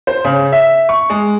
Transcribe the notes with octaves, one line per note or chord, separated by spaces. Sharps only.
C5
C#3
E5
C#6
G#3